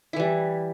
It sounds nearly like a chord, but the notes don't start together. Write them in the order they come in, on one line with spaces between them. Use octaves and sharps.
E4 E3 G3